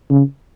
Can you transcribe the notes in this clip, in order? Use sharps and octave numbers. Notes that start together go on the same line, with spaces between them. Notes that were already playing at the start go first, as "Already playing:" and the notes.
C#3